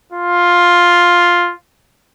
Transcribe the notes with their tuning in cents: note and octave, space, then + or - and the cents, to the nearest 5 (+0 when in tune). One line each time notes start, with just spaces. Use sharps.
F4 +5